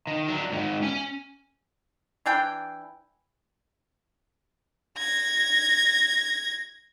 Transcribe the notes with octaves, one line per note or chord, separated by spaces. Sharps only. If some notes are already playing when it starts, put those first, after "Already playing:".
D#3
F#3 D4
G#2 D#3
C#4 G#5
E3 D4 G5
G#6 A#6